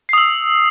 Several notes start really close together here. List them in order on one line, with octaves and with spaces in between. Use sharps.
C7 D#6 E6